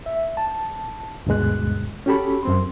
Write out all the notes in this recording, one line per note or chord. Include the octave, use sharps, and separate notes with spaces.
E5
A5
D2 G2 B2 G#3 F#6
C#4 F#4 G4 A4 B5
F#2 C4 C6